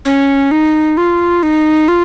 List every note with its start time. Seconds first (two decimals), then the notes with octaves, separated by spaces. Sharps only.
0.05 C#4
0.51 D#4
0.97 F4
1.43 D#4
1.88 F4